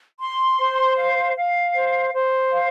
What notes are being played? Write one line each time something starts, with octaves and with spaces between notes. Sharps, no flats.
C6
C5
F5
F5
C5
C5
F5